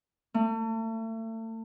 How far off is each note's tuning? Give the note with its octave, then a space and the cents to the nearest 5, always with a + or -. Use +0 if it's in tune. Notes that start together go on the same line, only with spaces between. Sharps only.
A3 +35